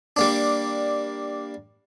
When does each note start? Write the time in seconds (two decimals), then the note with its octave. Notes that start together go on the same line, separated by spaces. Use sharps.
0.16 G3 A#3 D4